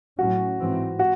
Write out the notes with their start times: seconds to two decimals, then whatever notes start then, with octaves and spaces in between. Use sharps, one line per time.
0.18 A2 F#3 C#4 F#4
0.59 G#2 E3 C4
0.99 F#4